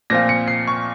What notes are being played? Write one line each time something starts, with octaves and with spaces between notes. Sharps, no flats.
A#2 F3 C4 F4 A#6
C#7
C7
C#6